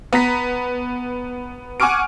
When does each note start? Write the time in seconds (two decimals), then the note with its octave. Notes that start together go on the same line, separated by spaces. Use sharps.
0.13 B3 A#5 B6
1.80 F#5 G#5 C#6 D6 F6 D7